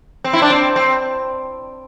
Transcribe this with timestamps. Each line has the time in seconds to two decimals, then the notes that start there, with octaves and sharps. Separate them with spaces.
0.24 C4
0.33 E4
0.42 D4
0.50 C4
0.76 C4